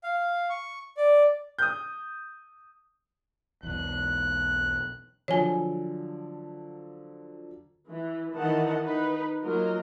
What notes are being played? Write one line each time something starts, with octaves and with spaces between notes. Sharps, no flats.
F5
C#6
D5
D#6 G6
B1 E2 F#6
D3 F3 F#3 C#5 G#5
E3
D#3 E3 D#5 F#5 A5
D#4 B4
F#3 A#3 F4 A#4 D#5